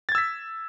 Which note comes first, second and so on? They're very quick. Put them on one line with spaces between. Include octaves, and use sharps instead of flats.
A6 G#6 E6 B6